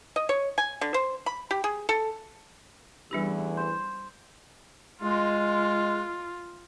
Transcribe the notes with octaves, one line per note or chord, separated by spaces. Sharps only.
D#5
C#5
G#5
D3
C5
B5
G4
G#4
A4
A1 E2 E3 G3 D4 G4
C5
G#3 F4